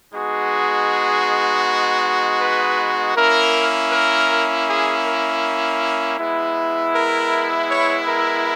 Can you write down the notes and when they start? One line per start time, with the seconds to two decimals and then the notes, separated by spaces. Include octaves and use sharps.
0.13 G#3 B3 D#4 F#4 G#4
2.40 B4
3.15 A#3 C#4 E4 A#4
3.91 A#4
4.67 G#4
5.05 A#4
6.19 G#3 B3 E4
6.94 A#4
7.70 C#5
8.07 A#4